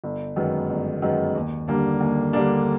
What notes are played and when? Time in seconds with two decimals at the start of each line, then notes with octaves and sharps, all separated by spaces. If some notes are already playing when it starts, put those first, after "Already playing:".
0.04 G1
0.36 F#2 D#3 G#3 B3
0.69 G1
1.02 F#2 D#3 G#3 B3
1.35 D#2
1.68 D3 G3 A#3 D4
2.00 D#2
2.33 D3 G3 A#3 D4